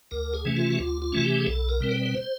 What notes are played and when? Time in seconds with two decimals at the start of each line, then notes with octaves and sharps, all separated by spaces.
0.11 D2 A#4
0.34 G#4
0.45 C3 E3 A3 C#4
0.56 F4
0.70 F#4
0.79 D2 F4
1.02 F4
1.12 C3 E3 A3 C#4 F#4
1.24 G4
1.38 G#4
1.47 B1 A4
1.69 A#4
1.81 B2 G3 C4
1.91 B4
2.06 B4
2.15 C5